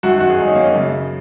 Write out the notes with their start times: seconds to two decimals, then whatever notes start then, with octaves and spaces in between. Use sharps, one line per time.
0.03 F#2 D#3 F#4
0.20 F#4
0.29 G#4
0.38 F#2 D#3 D#4
0.48 C#4
0.55 A#3
0.64 C#4
0.75 F#2 C#3